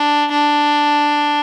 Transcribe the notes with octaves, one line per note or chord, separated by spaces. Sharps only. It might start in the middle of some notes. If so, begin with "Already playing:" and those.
Already playing: D4
D4